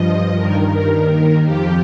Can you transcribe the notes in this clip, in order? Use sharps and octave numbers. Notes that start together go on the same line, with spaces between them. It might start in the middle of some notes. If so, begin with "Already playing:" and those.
Already playing: G2 F3 D#5
G2 D#3 A#4
D#2 D#3
F2 F3 G4